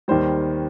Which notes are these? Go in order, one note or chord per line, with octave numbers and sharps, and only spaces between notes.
D#2 D#3 G3 C5